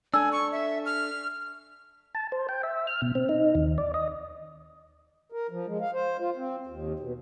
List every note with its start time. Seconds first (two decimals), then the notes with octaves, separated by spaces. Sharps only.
0.14 D4 A4 G#5 E6
0.32 C#6
0.52 E5
0.86 F6
2.15 A5
2.32 C5
2.49 G5
2.63 E5
2.87 F6
3.02 B2
3.15 C4
3.29 D#4
3.55 D#2
3.78 D5
3.94 D#5
5.32 A#4
5.51 F3
5.67 G#3
5.81 F5
5.94 C5
6.19 F4
6.36 C4
6.67 D#2
7.00 B2